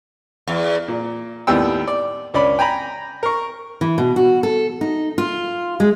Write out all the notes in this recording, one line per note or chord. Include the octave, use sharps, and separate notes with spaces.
E2
A#2
D#2 A2 G3 B3 G5 E6
D5
C#2 C#4 D4 D5 B5
G5 G#5 A#5 B5
A#4 C#6
E3
B2
F#4
A4
D#4
F4
G#3